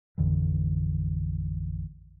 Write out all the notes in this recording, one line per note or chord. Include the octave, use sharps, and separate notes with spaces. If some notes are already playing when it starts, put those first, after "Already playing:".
A1 F2 D3 E3